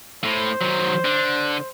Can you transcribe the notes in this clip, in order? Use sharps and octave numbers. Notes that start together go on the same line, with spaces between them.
A2 C5
D#3 F#3
D3